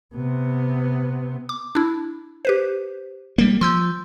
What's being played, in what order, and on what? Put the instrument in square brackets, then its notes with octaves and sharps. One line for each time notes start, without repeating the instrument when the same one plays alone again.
[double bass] C3 B3
[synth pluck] D6
D4 E4
G4 B4 C5
[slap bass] G3 A#3
[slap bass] F3 [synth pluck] C6 E6 G6